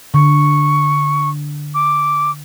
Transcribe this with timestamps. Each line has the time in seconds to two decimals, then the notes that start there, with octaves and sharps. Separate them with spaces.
0.14 D3 C#6
1.74 D6